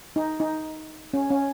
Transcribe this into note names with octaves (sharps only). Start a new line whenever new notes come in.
D#4
D#4
C#4
C#4